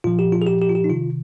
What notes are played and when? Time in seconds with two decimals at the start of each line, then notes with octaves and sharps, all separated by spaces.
0.04 A#2 F3 F4
0.19 G4
0.32 F4
0.42 G#4
0.47 G4
0.62 G4
0.69 F4
0.75 G4
0.84 D#4
0.90 C3 D#3 F4